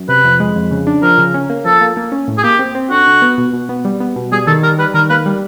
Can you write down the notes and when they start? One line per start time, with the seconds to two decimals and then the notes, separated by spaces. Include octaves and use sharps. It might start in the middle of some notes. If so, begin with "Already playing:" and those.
Already playing: F#2
0.09 C3 B4
0.24 F2
0.40 G#3
0.56 F2
0.71 C#3
0.87 D4
1.02 F3 A#4
1.18 C#3
1.34 C#4
1.50 A#3
1.65 F3 A4
1.81 A#3
1.97 A#3
2.12 C#4
2.28 A2
2.38 G#4
2.43 A#3 G4
2.59 C4
2.75 C4
2.90 D3 F#4
3.07 D3
3.22 B3
3.38 B2
3.53 B2
3.69 B3
3.85 G3
4.00 B3
4.16 B2
4.32 G3 G#4
4.47 D#3 A4
4.63 G3 A#4
4.78 G3 B4
4.94 D#3 A#4
5.10 A#3 B4
5.26 G3